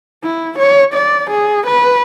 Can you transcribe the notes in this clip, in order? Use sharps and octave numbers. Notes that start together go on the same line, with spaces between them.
E4
C#5
D5
G#4
B4